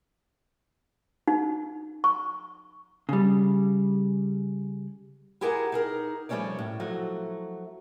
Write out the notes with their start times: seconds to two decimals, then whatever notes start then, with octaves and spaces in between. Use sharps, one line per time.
1.28 D#4
2.04 C#6
3.09 C#3 G3
5.41 E4 G4 G#4 A#4 F#5 A5
5.72 D#4 G#4 A#4
6.29 F3 G3 A3 C#4 C#5 D5
6.59 A2
6.80 F3 F#3 A3 F#4